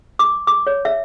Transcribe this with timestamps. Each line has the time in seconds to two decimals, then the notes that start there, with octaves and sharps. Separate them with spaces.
0.19 D6
0.47 D6
0.67 C#5
0.85 E5